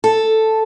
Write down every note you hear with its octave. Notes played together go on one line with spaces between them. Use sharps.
A4